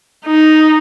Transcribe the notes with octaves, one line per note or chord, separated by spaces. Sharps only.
D#4